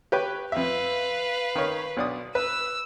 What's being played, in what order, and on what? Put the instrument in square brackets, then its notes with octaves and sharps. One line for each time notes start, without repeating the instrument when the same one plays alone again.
[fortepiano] G4 B4 C#5
[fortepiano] F2 E5 [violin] B4 F5
[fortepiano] D#3 C#5
B1 D4 D#6
[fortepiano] B4 [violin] E6